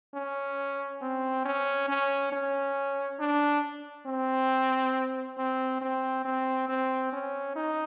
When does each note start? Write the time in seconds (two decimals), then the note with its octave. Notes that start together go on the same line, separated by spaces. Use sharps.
0.15 C#4
1.02 C4
1.45 C#4
1.89 C#4
2.32 C#4
3.20 D4
4.07 C4
5.38 C4
5.82 C4
6.25 C4
6.69 C4
7.13 C#4
7.56 D#4